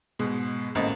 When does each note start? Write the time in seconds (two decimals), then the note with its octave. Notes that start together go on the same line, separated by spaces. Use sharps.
0.19 G#2 B2 G#3
0.75 G#1 A2 A#3 C#4 D#5